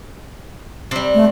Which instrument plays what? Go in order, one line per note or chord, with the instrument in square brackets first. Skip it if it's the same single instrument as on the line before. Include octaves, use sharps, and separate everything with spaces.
[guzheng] C3 G3
[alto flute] A3